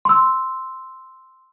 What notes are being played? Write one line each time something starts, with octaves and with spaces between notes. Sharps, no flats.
C6 E6